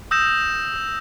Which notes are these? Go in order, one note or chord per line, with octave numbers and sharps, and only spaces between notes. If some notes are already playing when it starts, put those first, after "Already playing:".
D#6 E6 G6 A#6 E7